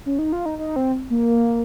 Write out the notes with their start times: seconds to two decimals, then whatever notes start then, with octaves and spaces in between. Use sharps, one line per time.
0.06 C#4
0.19 D#4
0.32 F4
0.46 D#4
0.59 D#4
0.76 C4
1.10 A#3